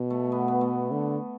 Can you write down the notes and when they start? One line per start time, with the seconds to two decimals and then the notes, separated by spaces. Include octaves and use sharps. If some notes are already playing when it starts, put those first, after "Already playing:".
Already playing: B2
0.10 A3
0.32 B3
0.48 B3
0.61 A3
0.92 D3